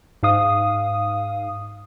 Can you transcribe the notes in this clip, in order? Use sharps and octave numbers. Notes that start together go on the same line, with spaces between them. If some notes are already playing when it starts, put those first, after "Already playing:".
G#2 F5 D#6